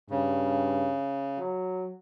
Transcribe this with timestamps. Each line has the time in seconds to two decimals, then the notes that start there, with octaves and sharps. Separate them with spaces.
0.10 G2 C#3
1.38 F#3